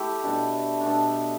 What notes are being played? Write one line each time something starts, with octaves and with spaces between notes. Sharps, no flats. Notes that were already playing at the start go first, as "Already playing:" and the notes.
Already playing: A3 E4 G4
B2 A3 D4
D4
B2 A3 B3